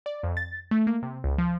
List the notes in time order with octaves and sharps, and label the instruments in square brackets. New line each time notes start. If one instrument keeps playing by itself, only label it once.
[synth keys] D5
F2
A6
A3
A#3
C3
C#2
F3